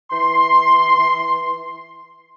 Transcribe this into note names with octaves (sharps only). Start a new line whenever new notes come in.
E3 C6